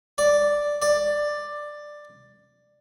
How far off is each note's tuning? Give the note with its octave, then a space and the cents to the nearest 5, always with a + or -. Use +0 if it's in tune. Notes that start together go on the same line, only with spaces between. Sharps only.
D5 +0
D5 +10